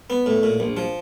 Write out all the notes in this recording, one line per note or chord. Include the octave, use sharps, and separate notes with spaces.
B3
A2
A#2
A#1
F3